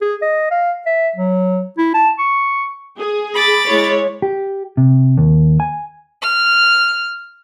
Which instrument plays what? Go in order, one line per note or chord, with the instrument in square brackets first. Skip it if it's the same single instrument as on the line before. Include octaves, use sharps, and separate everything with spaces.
[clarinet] G#4
D#5
F5
E5
F#3
E4
A5
C#6
[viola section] G#4
[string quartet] B5 D6 A6
[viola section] G#3 E4 C#5
[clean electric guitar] G4
C3
D#2
G#5
[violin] F6